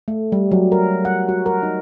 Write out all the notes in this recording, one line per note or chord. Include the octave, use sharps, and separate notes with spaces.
A3
G3
F#3
A#4
F#5
F#4
A#4
D#4